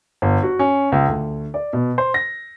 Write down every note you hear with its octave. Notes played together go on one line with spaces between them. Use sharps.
G1
F#4
C#4
C#2
D2
D5
B2
C5
A#6